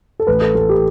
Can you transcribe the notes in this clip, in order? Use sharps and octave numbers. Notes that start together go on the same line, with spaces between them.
A4
A1 B4
A4
A1 A4
G4